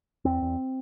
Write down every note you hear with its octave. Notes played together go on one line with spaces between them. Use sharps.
E2 C4
E2